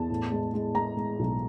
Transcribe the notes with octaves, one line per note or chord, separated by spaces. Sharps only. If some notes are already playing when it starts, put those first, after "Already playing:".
Already playing: E2 A5
A2
G#3
G#3
G#3 A#5
G#3
B1